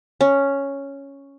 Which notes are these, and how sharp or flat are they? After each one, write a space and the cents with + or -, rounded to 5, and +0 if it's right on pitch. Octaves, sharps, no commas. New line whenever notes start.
C#4 +0